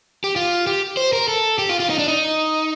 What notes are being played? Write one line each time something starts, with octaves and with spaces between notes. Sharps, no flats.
G4
F4
G4
C5
A#4
A4
G4
F4
F4
D#4
D4
D#4